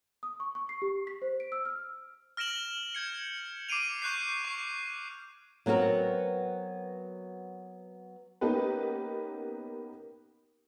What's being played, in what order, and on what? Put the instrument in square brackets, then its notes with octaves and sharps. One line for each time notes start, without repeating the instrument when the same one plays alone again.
[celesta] D#6
C#6
C#6
C7
G4
B6
C5
D7
E6
F6
[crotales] F6 A#6 D7 E7 F#7
G6 G#6 C#7
D6 C7 D7 D#7 F7
C#6 F#6 G6 C7
C#6 C7
[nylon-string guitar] F#3 B3 C4 F#4 A#4
[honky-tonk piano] A#3 B3 C#4 D#4 G4 B4